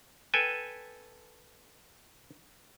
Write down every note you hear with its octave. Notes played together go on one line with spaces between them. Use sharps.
A4 B4 G5 G#5